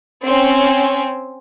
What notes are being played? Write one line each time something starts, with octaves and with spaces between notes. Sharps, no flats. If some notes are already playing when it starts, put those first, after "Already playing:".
C4 C#4